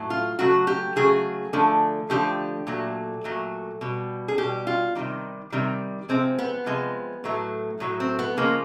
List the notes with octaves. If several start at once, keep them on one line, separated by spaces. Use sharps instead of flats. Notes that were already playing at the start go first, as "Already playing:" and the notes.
Already playing: A2 F#3 A3
F4
C#3 F#3 A3 F#4
G4
C#3 F#3 A3 G#4
D3 F3 A3
D3 F3 A3 G4
A#2 F#3 A3
A#2 F#3 A3
B2 G3
G#4
B2 G3 G4
F4
C3 D#3 G3
C3 D#3 G3
C3 F3 G#3 C4
B3
C3 F3 G#3
A2 F#3 A3
A2 F#3 A3
C4
B3
C#3 F3 G#3 A#3